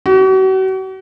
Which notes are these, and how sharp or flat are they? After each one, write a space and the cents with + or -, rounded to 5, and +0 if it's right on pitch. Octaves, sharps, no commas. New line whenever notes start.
F#4 +40